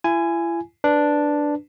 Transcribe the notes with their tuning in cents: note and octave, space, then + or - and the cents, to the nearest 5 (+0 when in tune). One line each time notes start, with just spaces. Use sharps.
E4 +40 G#5 +0
D4 +0 B4 +0